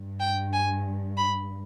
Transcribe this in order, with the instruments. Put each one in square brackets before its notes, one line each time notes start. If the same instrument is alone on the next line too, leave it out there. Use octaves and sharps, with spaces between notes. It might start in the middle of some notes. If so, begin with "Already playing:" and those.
Already playing: [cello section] G2
[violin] G5
G#5
B5